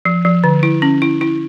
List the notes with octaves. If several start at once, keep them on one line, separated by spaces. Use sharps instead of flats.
F3
F3
D3
E4
C#4
E4
E4